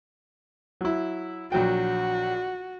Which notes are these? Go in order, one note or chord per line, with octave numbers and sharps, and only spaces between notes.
F#3 E4
A#1 F#3 F#4 G5